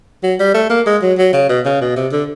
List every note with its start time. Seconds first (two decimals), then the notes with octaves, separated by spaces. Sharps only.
0.23 F#3
0.40 G3
0.54 A3
0.70 A#3
0.86 G#3
1.02 F#3
1.18 F#3
1.33 C#3
1.49 B2
1.66 C#3
1.81 B2
1.96 C3
2.12 D3